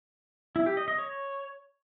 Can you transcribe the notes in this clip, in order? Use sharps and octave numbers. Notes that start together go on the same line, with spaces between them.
E4
G4
D#5
D#5
C#5